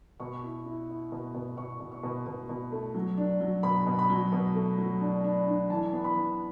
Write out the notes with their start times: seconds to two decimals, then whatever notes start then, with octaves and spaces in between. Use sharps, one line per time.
0.20 B2 C#6
0.43 E4
0.66 E4
0.89 E4
1.12 B2
1.34 B2
1.57 B2 C#6
1.80 B2
1.92 C#6
2.03 B2
2.26 B2
2.49 B2
2.72 A3
2.94 F#3
3.17 D4
3.41 F#3
3.63 B2 B5
3.87 B2
3.99 B5
4.10 F#3
4.32 B2
4.55 A3
4.78 F#3
5.01 D4
5.24 D4
5.47 D4
5.70 E3 A5
5.93 B3
6.04 B5
6.16 E3